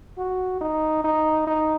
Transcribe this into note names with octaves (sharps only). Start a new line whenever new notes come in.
F#4
D#4
D#4
D#4